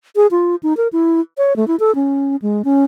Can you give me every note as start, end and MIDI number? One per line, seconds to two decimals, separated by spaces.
0.16 0.27 68
0.31 0.56 65
0.63 0.76 63
0.77 0.88 70
0.93 1.20 64
1.38 1.56 73
1.56 1.67 57
1.68 1.76 64
1.80 1.94 69
1.95 2.36 61
2.42 2.62 56
2.65 2.85 61